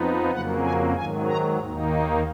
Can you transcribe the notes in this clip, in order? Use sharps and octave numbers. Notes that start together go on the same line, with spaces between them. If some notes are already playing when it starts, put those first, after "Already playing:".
Already playing: F2 F3 B3 D#4
F2 C#3 F#3 A#3 F#5
G#5
G#2 D#3 F#3 G#5
A#5
D#2 D#3 A#3 D#4
D#5